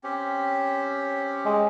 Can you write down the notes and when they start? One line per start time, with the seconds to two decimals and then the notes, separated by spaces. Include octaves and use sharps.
0.04 C4 C#4 G4
1.45 G#3